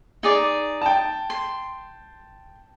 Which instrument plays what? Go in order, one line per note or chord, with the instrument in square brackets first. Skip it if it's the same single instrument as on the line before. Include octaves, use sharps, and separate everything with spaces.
[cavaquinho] D#4 G#4 D5
[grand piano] G5 A5
[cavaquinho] C6